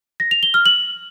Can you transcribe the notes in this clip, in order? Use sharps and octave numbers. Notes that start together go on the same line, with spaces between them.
A#6
F7
G7
F6
F#7